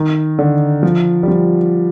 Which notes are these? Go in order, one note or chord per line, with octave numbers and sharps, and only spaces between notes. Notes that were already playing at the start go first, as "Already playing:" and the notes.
Already playing: D#3
D3
F3
G3
F3